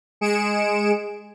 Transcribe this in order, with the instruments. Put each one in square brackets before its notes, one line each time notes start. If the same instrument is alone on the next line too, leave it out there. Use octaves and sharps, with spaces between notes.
[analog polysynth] G#3 G#4 C#7 D7 E7